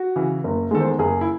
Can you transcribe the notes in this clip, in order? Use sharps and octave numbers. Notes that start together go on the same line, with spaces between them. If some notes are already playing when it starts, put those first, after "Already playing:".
Already playing: F#4
C#3 E3
F#1
E2 D#3 G#3 A4
C5
F#1 G#4
E4